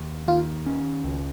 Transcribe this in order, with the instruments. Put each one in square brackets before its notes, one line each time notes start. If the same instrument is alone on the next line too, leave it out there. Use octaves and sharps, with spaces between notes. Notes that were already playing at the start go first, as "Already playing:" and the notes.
Already playing: [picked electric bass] D#2
[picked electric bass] D#3 [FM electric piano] F4
[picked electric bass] C#4
C#2